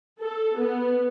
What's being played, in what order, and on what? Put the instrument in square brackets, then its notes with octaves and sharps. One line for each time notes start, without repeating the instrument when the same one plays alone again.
[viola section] A4
B3